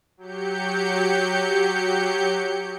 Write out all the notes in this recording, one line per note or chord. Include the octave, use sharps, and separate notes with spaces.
F#3 G4 G6 C#7